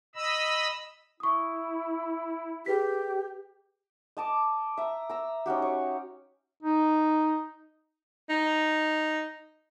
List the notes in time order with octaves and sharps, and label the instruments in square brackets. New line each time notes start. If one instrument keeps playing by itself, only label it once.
[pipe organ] D#5 B5 E6
[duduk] E4 [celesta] C#6 D#6
[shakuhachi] G4 [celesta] G#4 B4 B6
[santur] D#5 A5 D6
E5 A#5
A#5 E6
C#4 D#4 F#4 G4
C#5
[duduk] D#4
[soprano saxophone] D#4